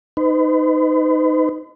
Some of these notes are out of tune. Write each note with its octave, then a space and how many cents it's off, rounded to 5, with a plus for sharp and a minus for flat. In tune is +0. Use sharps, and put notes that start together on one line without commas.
D#4 +0 B4 +45